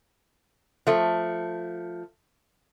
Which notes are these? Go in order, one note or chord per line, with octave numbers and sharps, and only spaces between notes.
F3 A3